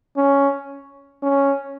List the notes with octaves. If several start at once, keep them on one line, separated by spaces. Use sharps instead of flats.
C#4
C#4